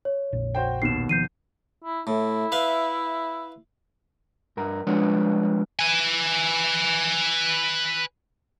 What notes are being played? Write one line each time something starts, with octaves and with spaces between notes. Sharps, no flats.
C#5
A#1 F2 A#2
F#4 C5 G5
D#2 B2 C7 E7
D#3 F3 G6 C7 D#7
E4
A2 E4
B4 E5 F5
G2 A#4 A#5
F3 G3 G#3 D4 B4 C#5
B4 G#5